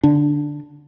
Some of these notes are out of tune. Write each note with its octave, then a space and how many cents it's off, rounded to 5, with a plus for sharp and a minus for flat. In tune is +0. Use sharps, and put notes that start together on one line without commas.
D3 +0 D4 +0